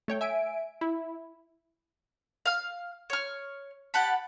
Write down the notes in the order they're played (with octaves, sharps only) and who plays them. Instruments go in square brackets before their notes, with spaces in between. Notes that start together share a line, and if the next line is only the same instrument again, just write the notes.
[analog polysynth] A3 C#5 G5
E5 G#5 D7
E4
[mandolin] F5 F6
C#5 F6
G4 F#5 A5 B5